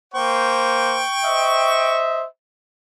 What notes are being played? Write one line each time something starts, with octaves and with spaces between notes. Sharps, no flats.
A#3 C5 G5 C#6
C5 D#5 E5